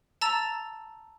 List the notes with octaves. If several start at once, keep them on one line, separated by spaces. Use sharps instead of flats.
A5 A#5 E6 A6 F7